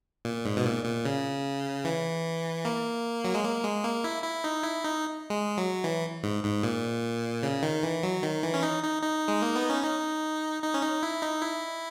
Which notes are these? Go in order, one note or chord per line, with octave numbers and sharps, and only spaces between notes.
A#2
G#2
B2
A#2
A#2
C#3
E3
A#3
F#3
G#3
A#3
G#3
A#3
E4
E4
D#4
E4
D#4
G#3
F#3
E3
G#2
G#2
A#2
C#3
D#3
E3
F#3
D#3
E3
C#4
D#4
D#4
D#4
G#3
A#3
B3
C#4
D#4
D#4
C#4
D#4
E4
D#4
E4